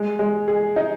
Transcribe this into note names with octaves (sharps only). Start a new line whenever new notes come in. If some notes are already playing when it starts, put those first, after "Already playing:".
Already playing: G#3
G#3
G#4
D#4